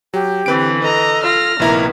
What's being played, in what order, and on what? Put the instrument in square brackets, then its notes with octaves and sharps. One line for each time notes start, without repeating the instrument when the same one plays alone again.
[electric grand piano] F#3 [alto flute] G4
[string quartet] D3 E3 [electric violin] C4 [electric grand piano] B4 D7
[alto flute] A4 [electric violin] D#5 A#5
[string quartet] F4 [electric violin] F6 A#6
[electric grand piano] A#1 E4 A#5 [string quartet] C3 D#3 B3 [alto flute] A#3